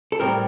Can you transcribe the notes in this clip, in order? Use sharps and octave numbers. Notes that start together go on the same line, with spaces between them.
A4
A2 G3 C4 G4 A#4